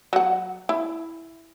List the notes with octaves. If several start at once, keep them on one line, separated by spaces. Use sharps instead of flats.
F#3 F#5
E4